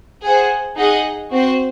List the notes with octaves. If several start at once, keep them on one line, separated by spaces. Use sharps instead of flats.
G#4 C5 F#5
D#4 G#4 D#5 F#5
C4 F#4 C5